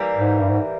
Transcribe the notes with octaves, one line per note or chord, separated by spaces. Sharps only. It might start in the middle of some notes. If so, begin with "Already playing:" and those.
Already playing: E3 G3 A#3
G#2
G2
G#2